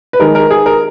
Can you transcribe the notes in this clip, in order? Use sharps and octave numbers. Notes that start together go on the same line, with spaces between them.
B4
D#3 G#3 D#4 A#4
A#4
G#4
A#4